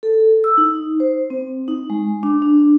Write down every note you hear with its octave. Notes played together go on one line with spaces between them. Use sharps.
A4
E6
D#4
C5
C4
D#4
G#3
D4
D4